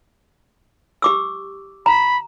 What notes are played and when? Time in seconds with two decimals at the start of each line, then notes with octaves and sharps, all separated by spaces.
1.02 G4 D6 E6
1.86 A#5 B5